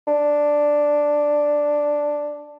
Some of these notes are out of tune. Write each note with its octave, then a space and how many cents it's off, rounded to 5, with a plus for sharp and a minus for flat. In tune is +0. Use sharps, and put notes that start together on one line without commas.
D4 +0